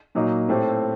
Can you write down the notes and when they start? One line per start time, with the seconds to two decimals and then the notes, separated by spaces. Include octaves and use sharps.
0.15 A#2 F#3 A#3 D#4
0.49 A2 A3 C4 G4